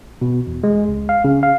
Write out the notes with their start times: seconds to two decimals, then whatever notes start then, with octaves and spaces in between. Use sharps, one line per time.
0.21 B2
0.47 E2
0.64 G#3
0.89 C#2
1.09 F5
1.24 C#3
1.43 F5